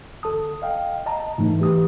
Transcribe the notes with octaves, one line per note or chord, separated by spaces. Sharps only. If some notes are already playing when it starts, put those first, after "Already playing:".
G1 A4 A5 D#6
D#5 F5 G5
D#5 A5 A#5
G#2 E3 A3 D#4
E3 G4 D#6